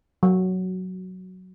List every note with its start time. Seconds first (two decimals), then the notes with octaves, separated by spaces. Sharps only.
0.23 F#3